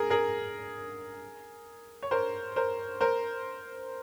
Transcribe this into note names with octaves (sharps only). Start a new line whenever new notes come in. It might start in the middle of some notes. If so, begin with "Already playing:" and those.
Already playing: G#4 A#4
G#4 A#4
C#5
A#4 C5
A#4 C5
A#4 C5